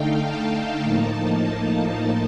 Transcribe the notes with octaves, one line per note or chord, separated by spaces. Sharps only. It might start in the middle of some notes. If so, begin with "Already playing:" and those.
Already playing: D3 A3 D#4 F5 G5
A5
A2 F3 A#3 D#4